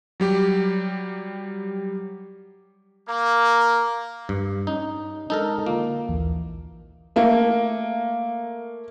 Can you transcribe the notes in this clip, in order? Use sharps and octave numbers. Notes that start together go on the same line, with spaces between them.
F#3 G3 G4
A#3
G2
C#4 D#4
G#3 D4 D#4 A4 A#4
D3 A#3 F4
A#1 D#2 E3
A3 A#3